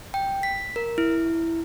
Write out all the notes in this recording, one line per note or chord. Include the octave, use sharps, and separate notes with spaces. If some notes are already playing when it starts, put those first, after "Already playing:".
G5
B6
A#4
E4